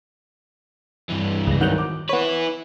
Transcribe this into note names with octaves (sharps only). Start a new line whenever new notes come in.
G2 E3
C#2 A#6
D#3 F#3 F#5 F#6 G6 F7
D6
B3 E4 B4 C#5